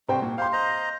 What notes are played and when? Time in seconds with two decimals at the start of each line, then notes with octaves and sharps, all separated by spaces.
0.09 C2 A3 F#4 C5 G5
0.22 A#2
0.38 G4 C5 F5 C6
0.52 C5 D#5 A#5